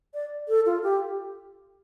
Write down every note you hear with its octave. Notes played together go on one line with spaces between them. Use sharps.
D5
A4
F4
G4